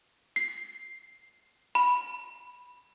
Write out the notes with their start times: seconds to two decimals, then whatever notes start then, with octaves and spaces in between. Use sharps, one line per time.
0.36 C7
1.75 B5